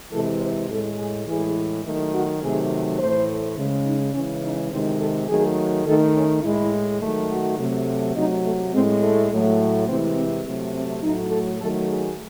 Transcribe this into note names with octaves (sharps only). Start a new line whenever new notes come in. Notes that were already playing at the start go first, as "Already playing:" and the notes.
C3 E3 G#3 A4
C5
A2 G#3 A4
G#4
A2 E3 G#3 G#4
D#3 F#3 A3
F#4
C3 D#3 F#3 A3 G#4
A2 E3 A3 C5
C#3 G#3
D#4
C#3 E3 G#3 C#4
D#4
C3 D#3 G#3 C5
A4
D#3 F#3 A3 G#4
D#3 A3 A4
C#4
A2 G#3 E4
D#3 F#3 A3
F#4
C3 F#3 A3
C3 F#3 A3 D#4
A3
A2 G#3 C4
A3
A2 F#3 A3
C3 E3 G#3 C4
C4
C3 F#3 A3
C4
A2 F#3 A3 D#4
A4
D#3 F#3 A3 A4
G#4